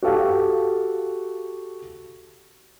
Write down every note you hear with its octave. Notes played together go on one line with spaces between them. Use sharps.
F#4 G4 A4 F5